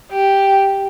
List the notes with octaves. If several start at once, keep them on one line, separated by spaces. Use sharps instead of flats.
G4